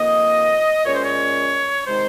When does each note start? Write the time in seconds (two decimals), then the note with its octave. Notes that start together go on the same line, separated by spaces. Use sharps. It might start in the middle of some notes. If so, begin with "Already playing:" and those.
Already playing: F2 D#3 A#3 D#5
0.85 A#2 G#3 C#4 C#5
0.95 C5
1.05 C#5
1.87 C3 D#3 G#3 D#4 C5